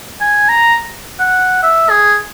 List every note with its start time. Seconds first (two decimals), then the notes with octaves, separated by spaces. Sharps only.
0.20 G#5
0.49 A#5
1.20 F#5
1.62 E5
1.90 G#4